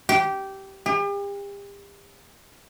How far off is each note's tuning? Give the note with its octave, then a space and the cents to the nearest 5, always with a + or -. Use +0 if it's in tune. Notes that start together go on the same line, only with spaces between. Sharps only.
G4 -15
G4 +40